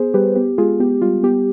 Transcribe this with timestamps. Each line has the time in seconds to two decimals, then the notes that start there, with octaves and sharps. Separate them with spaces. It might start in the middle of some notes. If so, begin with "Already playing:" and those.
Already playing: B3 G#4 C5
0.14 G3 G4 B4
0.36 B3 G4
0.58 G#3 F4 G#4
0.80 B3 G4
1.02 G3 F4
1.23 B3 G4